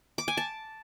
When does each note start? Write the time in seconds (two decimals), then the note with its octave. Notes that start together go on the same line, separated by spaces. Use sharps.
0.18 D6
0.28 G#5
0.37 A5